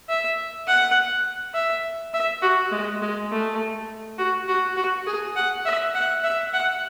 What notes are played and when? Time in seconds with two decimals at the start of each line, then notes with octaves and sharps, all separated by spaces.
0.09 E5
0.67 F#5
1.54 E5
2.14 E5
2.42 F#4
2.72 G#3
3.02 G#3
3.31 A3
4.18 F#4
4.48 F#4
4.76 F#4
5.07 G#4
5.36 F#5
5.65 E5
5.95 F#5
6.23 E5
6.53 F#5